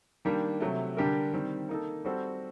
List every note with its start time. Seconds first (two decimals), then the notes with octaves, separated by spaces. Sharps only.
0.25 D#3 G3 A#3 D4
0.60 C3 F#3 A3
0.97 D3 G3 D4 G4 A#4
1.33 D#3 G3 C4
1.69 A#3 D#4 A4
2.05 G3 C4 F#4 A4 C5